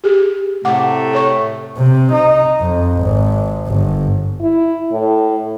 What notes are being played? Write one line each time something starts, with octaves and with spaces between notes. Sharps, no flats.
G4 G#4
A2 C3 A3 F#5 D6
A4 C#5 C#6
C3
D#4
F2
G#1
G1
E4
A2